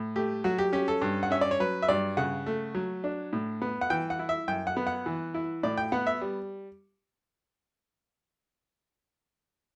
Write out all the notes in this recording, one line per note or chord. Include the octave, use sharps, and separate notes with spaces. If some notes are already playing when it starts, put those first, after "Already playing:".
Already playing: A2
A3 G4
F#3 F#4
G4
C#4 G4
A4
G2
F#5
C#4 E5
D5
C#5
F#3 B4
E5
G2 D5
C#3 F#5
A3
F#3
D4
A2
B3
F#5
E3 G5
F#5
E4
E5
F#2 G5
F#5
B3
F#5
E3
E4
A2 D5
G5
B3 F#5
E5
G3